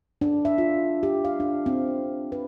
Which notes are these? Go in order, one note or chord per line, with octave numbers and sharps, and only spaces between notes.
D4
E5
F4
G4
F5
D4
C4
B4